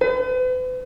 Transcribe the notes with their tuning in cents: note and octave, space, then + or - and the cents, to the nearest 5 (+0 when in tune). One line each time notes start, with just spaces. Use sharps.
B4 +45